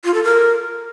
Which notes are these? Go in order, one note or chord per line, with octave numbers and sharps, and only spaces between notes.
F4
A4
A#4